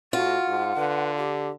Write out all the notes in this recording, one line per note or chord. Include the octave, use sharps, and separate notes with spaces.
A2 F4 F#4 F#5
G#2
D3 B4
G4